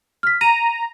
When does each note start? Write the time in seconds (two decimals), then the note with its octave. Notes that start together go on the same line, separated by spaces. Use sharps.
0.23 F6 B6
0.41 A#5 D#7